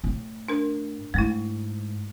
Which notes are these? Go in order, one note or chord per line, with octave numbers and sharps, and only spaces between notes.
A2
D4 A#4
G#2 G#3 A3 E4